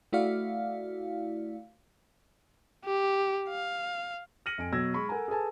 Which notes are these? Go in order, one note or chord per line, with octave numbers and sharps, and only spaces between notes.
A3 E4 F#4 D5 F5
G4
F5
F6 A#6 C#7 D#7 F#7
F2 G#5 D7
B2 F#3 E6 G#6 A#6
G#3 B5 C#6
A4 A#4 F#5 G#5 A#5
G#4 A4 B4 G#5 A5